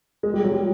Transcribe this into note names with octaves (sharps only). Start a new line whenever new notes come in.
G#3
G3
F#3
G3